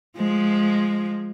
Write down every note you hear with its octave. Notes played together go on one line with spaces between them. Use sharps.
F3 G#3